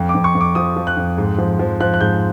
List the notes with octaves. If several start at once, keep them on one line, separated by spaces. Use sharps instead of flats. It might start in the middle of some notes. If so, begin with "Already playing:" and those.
Already playing: F2
D6
F2
C#6
F2
D6
F3 D#6
F3
F#6
F2
G#2
F3
F3
F3 F#6
F#6
G#2 G6